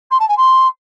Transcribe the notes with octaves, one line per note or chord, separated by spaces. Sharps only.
C6
A5
G#5
C6